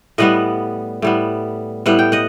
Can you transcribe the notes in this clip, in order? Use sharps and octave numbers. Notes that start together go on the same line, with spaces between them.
A2 G3 B3 D#5 F#5
A2 G3 B3
A2 G3 B3 F#5
G5
D#5 F#5